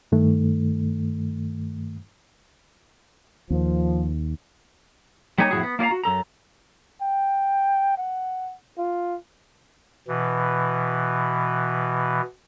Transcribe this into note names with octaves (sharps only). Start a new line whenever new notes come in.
G2 D#3 A3
D#2 F3
G3 A#3 D#4 C#5 G#5
F2 A2 D#3 E4 F#4 G#4
B3
A#3 F4 D5 F5 A#5
F#4
F#2 A4 A#5
G5
F#5
F4
B2 E3